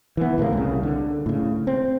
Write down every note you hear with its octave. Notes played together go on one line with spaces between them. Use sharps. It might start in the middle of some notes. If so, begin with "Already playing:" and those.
E3 B3
C#2 A2 C3 A#3
C2 C#3
D3
A2 C#3
C4